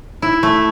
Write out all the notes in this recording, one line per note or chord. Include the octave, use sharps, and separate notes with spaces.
E4
A3